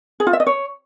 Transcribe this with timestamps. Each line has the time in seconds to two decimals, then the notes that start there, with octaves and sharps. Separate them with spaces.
0.20 G#4
0.27 F4
0.33 E5
0.40 D#5
0.47 C#5